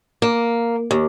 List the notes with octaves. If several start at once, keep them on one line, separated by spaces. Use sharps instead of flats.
A#3
D#2